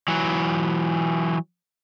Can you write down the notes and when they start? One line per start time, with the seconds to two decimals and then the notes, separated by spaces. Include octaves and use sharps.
0.08 E3 F#3